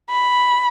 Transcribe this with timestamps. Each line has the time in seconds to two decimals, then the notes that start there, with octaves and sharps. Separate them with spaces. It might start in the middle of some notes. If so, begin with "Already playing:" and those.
0.10 B5